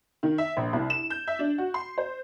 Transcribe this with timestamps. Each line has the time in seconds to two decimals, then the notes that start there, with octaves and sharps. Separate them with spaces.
0.23 D#3
0.38 E5
0.57 A#1
0.73 C2
0.90 E7
1.10 G6
1.27 E5
1.39 D4
1.58 F#4
1.74 C6
1.98 C5